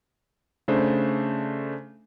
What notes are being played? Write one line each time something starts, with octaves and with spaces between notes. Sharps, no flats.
C#3 A3 D4 C5